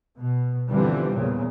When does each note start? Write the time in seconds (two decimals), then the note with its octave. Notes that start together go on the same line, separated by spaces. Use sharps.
0.18 B2
0.70 G1 D3 E3 F3 G3 C4
1.15 E2 A#2 C#3